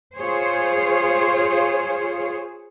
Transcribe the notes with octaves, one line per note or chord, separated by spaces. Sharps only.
F4 G#4 C5 C#5